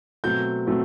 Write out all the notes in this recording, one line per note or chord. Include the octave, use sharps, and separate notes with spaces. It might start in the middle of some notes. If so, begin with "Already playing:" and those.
B2 F#3 A3 C4 G6
B2 F#3 A3 C4